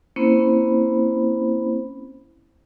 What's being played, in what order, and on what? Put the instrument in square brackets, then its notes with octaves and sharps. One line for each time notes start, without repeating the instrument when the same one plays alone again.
[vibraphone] A#3 C4 C#4 E4 C5 B5